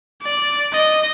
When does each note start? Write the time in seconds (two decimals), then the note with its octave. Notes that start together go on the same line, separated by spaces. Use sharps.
0.22 D5
0.73 D#5